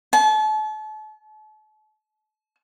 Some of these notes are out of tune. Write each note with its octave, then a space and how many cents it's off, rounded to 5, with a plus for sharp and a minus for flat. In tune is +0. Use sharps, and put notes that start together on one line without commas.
A5 -40